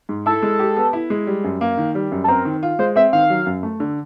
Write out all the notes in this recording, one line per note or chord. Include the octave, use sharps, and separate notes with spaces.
G#2
E4 A4
G#3
G4
B3
E4
G#3
G3
F#2
A#3
D#3
G3
F#2
A4
C4 A#4
D#3
F4
G#3 C5
C4 E5
D#3 F5
F#3
F#2
A3
D3